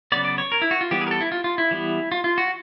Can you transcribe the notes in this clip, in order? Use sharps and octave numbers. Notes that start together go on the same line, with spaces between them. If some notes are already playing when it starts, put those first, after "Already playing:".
C#3 F#3 B3 D5
D5
C#5
A#4
E4
F#4
F4
E3 G3 B3 G4
G#4
A#4
A4
E4
F4
F4
E4
E3 G3 B3
F4
F4
F#4